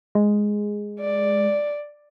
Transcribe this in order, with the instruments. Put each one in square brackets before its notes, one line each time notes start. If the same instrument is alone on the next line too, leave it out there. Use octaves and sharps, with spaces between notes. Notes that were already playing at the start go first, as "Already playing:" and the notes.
[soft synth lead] G#3
[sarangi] D5